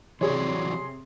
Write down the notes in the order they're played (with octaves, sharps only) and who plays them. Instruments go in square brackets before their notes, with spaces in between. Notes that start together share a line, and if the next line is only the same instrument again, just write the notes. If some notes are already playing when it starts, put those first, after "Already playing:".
[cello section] C3 [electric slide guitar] E3 F#3 D5 [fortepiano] G#4 C#5 [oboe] C6